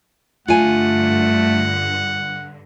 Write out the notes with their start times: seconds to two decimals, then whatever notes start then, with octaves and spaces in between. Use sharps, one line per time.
0.48 G2 D3 A3 F4 F#5 G#5